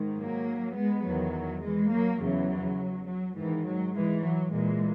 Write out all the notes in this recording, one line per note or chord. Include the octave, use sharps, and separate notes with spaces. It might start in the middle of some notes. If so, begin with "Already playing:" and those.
Already playing: G#2 D#3
F#3 A#3
G#3 B3
E2 D#3 F#3
E3 G#3
F#3 A#3
E2 C#3 E3 F#3
F#3
G#2 D#3 E3
F#3
E3 G#3
F#3
A#2 E3 G#3